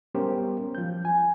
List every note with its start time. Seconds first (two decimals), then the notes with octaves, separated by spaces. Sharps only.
0.14 G3 B3 C#4 G4 A#4 C5
0.75 F3 G6
1.05 G#5